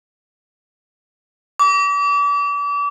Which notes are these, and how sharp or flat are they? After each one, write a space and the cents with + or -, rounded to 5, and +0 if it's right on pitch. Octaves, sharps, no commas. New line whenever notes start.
D6 -35